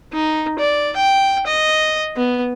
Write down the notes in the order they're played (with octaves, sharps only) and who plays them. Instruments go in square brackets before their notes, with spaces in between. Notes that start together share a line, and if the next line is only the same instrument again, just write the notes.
[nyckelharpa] D#4
D5
G5
D#5
B3